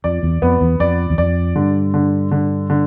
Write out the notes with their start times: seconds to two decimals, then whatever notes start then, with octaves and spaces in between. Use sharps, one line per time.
0.04 F2 D5
0.23 E2
0.42 F2 B3
0.61 E2
0.80 F2 D5
1.10 E2
1.18 F2 D5
1.56 G2 D3
1.94 D3
2.31 D3
2.70 D3